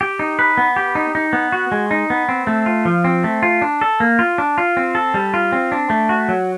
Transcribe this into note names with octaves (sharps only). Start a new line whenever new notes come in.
G4
D#4
B4
B3
G4
D#4
D#4
B3
F#4
G#3
D#4
B3
C4
A3
F4
F3
C4
A3
F4
D4
A4
A#3
F4
D4
F4
C4
A4
G3
F4
C4
D4
A3
F#4
F#3